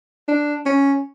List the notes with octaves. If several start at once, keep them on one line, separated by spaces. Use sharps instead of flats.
D4
C#4